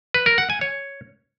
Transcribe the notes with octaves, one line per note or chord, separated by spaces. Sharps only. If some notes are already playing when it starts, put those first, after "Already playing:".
B4
A#4
F#5
G#5
C#5